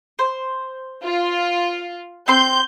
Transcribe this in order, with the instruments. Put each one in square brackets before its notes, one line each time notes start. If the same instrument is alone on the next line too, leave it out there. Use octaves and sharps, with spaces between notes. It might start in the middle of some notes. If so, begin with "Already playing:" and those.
[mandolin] C5
[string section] F4
[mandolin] C4 C6 [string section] G6